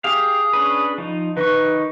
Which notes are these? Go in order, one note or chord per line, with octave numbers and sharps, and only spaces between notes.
G4 G#4 F5
C#4 D4 B4
F3 D#4
D#3 D#4 B4 C#6